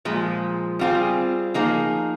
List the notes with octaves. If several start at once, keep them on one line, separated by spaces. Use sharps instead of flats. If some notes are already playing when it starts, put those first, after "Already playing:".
A#2 F3 G#3
G3 C4 F4 G#4
F3 A#3 D#4 G#4